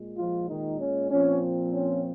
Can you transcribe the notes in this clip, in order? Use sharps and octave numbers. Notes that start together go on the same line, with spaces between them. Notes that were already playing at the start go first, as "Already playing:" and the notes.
Already playing: A#2 G#3
F3 F4
D#3 D#4
C#4
A#2 F3 C4 C#4
C#4